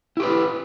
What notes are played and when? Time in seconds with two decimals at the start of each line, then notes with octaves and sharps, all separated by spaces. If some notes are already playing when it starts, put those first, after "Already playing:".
0.17 E4
0.20 G4
0.23 B4